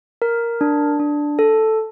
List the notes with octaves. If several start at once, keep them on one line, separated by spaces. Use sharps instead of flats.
A#4
D4
D4
A4